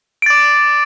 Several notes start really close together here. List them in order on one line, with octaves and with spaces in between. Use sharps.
D7 A6 D6